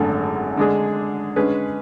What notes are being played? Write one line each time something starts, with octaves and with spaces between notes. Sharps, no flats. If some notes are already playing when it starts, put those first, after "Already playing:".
Already playing: G#1 F#2 D3 A3
D3 G#3 D4 G#4
D3 G#3 C#4 G#4 B4